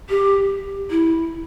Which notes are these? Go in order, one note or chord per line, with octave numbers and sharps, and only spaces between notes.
G4
E4